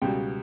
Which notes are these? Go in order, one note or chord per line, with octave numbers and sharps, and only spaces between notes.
C#2 B2 G3 G5